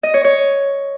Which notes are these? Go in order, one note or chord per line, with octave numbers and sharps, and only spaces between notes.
D#5
C#5
C#5